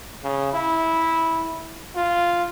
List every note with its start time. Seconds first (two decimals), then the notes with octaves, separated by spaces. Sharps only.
0.24 C#3
0.53 E4
1.96 F4